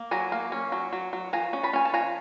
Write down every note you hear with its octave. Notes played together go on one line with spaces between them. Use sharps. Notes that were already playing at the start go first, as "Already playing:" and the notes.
Already playing: A#3
F#3 G#5 A#5
A#3
C#4
F#3
F#3
F#3
F3 G#5 A#5
C#4
A5 B5
C#4 G#5
A5
F3 G#5 A#5